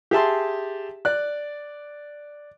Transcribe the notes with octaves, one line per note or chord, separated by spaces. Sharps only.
G4 G#4 E5 A5 C6
D5 F#6